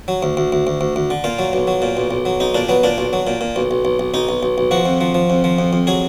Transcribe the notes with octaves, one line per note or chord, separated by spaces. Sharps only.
F#3
D2
D2
D2
D2
D2
D2
D3
A#2 F4
F#3
B1
F#3
A#2
B1
B1
F#3
B1 D#4
A#2 D4
F#3 B3
A#2 D4
B1
F#3
A#2
A#2
B1
B1
B1
B1
B1 D#4
B1
B1
B1
F3 F#4
F2
F3
F3
F2
F3
F2
F2
F#3 G#4